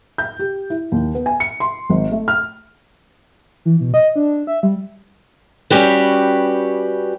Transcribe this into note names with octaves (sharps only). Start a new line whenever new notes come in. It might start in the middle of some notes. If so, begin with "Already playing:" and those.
G6
G4
E4
D#2
B3
G#5
C#7
C6
G#1
A3
F6
E3
B2
D#5
D4
E5
G3
G3 C#4 F#4 G4 B4